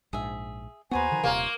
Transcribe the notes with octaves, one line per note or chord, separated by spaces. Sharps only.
A#1 G#2 G#4 E5
D#2 B3 F#4 G#4 B4 C5 G#5 A#5
D3 D#3 F3
D#1 C3 A#3 F4 C#5